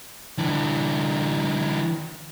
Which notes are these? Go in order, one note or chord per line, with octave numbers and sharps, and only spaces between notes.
D3 E3